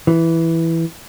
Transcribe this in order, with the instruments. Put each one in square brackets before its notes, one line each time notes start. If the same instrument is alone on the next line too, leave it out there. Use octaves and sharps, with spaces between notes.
[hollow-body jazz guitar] E3